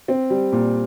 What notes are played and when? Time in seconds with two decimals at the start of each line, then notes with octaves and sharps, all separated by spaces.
0.08 C4
0.30 G3
0.52 A#2